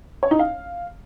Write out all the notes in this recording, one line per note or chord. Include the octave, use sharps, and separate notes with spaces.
C#5
D#4
F5